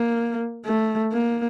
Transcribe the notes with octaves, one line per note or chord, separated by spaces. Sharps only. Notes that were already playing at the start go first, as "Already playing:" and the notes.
Already playing: A#3
A3
A#3